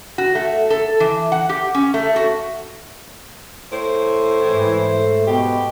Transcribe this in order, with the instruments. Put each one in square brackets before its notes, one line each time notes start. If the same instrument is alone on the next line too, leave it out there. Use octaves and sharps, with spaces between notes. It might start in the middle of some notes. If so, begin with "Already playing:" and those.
[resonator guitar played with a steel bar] F#4
A3
A4
E3
F#5
G4
C#4
A3
F#4
[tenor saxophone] A2 [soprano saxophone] C5
[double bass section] G#2 [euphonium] E3
[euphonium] A3
[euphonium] B2 [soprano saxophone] G4